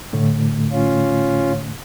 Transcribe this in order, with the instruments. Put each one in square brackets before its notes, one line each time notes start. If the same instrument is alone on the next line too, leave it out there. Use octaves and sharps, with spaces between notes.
[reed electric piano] A2 D3 A3
[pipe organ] C#4 F4